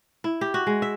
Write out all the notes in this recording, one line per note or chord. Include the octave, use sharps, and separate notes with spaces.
E4
G4
F#4
G#3
E5